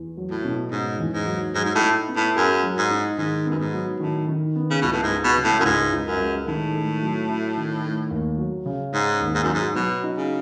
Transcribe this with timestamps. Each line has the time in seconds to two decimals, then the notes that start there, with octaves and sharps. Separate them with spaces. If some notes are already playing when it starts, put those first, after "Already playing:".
Already playing: E2
0.17 F#3
0.30 A2
0.45 B2
0.71 G#2 C#4
1.00 E2
1.13 G#2
1.26 F#3
1.54 G#2 F#3
1.65 G#2
1.75 A2
1.81 D#4
2.08 B3
2.16 A2
2.36 F#2 G#4
2.63 F#3
2.77 G#2
2.91 D#4
3.18 G#2 D#3
3.46 F#2 B3
3.59 G#2
3.74 F#3
4.00 A2 D#3
4.28 D#3
4.56 B3
4.70 C#3
4.81 C#2 B2
4.92 A2
5.03 G#2
5.10 G#3
5.24 B2
5.38 C#3
5.44 A2
5.60 F#2
5.65 C#2 G#2
5.92 C#2
6.06 F#2
6.20 G#3
6.47 A2 D#3
6.74 A3
7.02 F#3
7.29 E4
7.57 D#3
7.84 A3
8.11 D#2
8.38 F#3
8.66 C#3
8.93 G#2 C#4
9.21 D#2
9.35 G#2
9.44 F#2
9.49 G#2 F#3
9.75 B2 F#3
10.03 D#4
10.17 C#3